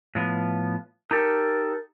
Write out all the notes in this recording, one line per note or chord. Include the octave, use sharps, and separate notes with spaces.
A2 F3 B3
D#4 G4 A4 A#4